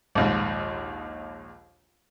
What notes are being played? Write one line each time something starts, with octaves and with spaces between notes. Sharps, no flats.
A#1 D#2 G#2